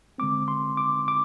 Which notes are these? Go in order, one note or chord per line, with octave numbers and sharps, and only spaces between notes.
D3 G#3 C4 D6
C6
D6
D6